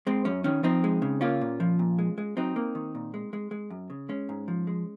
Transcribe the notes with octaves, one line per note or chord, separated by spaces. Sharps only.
G#3 C4
F#2 C#4
D#3 C#4
F3 C4 D#4
G#3
C#3
A#3 C#4 F4
A#2
F3
A#2
G#3
G#3
F#3 C4 D#4
A#3
D#3
A#2
G#3
G#3
G#3
F#2
C#3
G#3 C#4
G#2
F3
G#3